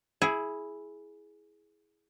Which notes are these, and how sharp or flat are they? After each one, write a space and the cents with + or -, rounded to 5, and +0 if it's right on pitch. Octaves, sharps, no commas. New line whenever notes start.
E4 -5 G#4 +10